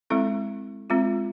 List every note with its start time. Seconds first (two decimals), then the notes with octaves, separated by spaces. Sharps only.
0.10 G#3 C4 E4 A4
0.90 G#3 C4 F4